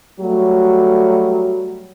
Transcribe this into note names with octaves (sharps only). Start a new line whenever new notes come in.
F#3 G3 A3 F#4